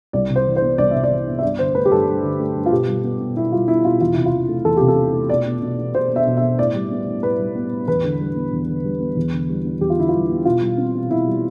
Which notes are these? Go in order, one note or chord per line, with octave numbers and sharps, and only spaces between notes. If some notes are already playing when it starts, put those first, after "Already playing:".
C2 D5
C3
C5
E3
C5
B3
C2 D5
C3 E5
D5
E3
B3
E5
G2 D5
D3 C5
A3 B4
G4
G2 A4
G2
D3
A3
G2
F4
B2 G4
G3
B3
B2
B2 E4
G3 F4
B3 E4
B2 F4
E2 F4
C3 E4
F4
E3
A3
E2 A4
C3 G4
A4
E3
A3
B2 D5
B3
B2
B3
B2 C5
B3
E5
B2
B3 E5
A2 D5
G3
B3
A2
A2 B4
G3
B3
A2
E2 B4
D3
G3
B3
E2
D3
G3
B3
E2
D3
G3
B3
E2 G4
F4
D3 E4
F4
G3
B3
B2 F4
G3
C4
B2
B2 E4
G3